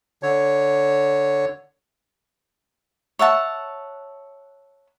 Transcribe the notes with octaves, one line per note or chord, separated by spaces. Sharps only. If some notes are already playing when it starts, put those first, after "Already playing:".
D3 C#5
C#5 E5 F#5 A5